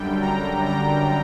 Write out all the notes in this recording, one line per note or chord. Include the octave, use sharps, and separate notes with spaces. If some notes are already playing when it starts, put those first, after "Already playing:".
Already playing: F#2 D3 G3 G5
A#5
A#5